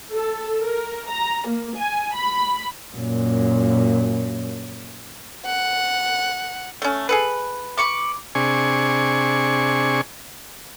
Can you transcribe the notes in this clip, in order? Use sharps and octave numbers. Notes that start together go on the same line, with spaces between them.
A4
A#4
A#5
A#3
G#5
B5
F#2 A#2
F#5
A3 C#4
G#4 A4 B4
B5 C#6 D6
C3 D4 G#4 G#5 C#6